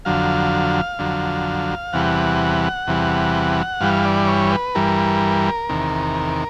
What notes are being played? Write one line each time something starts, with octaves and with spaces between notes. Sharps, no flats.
F2 D3 F#3 F5
F2 D3 F#3
E2 C3 E3 G3 F#5
E2 C3 E3 G3
G2 E3 G3 F5
D5
C#5
B4
G2 E3 G3 A#4
E2 C3 D#3